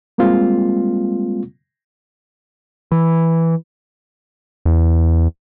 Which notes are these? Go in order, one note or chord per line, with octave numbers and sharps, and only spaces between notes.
G3 G#3 A#3 C4 F4
E3
E2